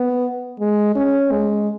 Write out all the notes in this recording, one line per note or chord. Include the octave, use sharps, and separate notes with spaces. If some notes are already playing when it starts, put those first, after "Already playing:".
Already playing: B3
G#3
C#4
G#3